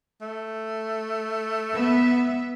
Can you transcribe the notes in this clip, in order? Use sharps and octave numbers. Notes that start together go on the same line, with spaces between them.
A3
B3 E5